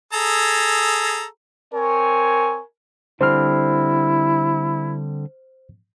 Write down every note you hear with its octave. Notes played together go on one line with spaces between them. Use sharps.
G#4 A4 A#5
C4 A#4 C#5 G#5
D3 G3 C4 E4 C5 F6